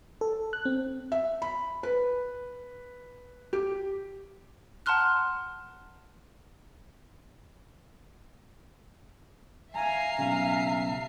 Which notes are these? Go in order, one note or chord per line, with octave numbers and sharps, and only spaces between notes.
A4
F#6
C4
E5
B5
B4
G4
F#5 A5 A#5 C6 F6 F#6
E5 F5 G#5 A#5 C7
B1 C#3 G#5